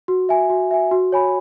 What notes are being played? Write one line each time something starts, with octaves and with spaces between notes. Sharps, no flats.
F#4
E5 G#5
F#4
E5 G#5
F#4
C#5 G#5 B5